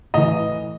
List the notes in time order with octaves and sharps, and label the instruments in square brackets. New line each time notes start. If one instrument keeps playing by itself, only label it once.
[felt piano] A2 E3 D#5